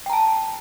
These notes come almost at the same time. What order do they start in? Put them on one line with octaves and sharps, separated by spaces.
G5 A#5 A5